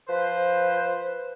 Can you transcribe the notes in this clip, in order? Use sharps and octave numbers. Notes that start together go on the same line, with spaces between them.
F3 B4 C5